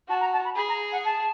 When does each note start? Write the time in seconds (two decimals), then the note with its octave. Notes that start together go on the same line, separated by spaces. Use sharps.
0.08 F#4 A5
0.20 A#5
0.32 A5
0.44 B5
0.56 G#4 B5
0.68 A#5
0.91 F#5
1.04 A5